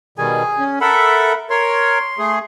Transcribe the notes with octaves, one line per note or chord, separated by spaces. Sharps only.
B2 D#3 G3 G#4 G#5
C#4
A4 A#4 E5 F#5 B5
A#4 C#5 C6
A3 G#4